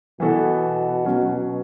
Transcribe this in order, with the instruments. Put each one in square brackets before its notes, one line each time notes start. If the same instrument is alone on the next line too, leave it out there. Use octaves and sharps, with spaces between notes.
[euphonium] B2 [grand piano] E3 B3 F#4 A4
[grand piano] F#3 C#4 F#4